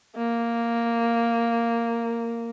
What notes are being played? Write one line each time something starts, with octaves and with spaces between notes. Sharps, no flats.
A#3